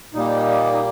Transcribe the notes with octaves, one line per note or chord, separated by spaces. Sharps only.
A#2 G3 A#3 D#4
D#4